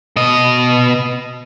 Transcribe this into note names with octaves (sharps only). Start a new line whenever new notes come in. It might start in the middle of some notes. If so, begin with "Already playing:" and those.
B2 D#5